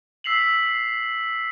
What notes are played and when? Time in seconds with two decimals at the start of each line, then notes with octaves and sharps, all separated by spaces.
0.24 E6 B6 C7 F7 F#7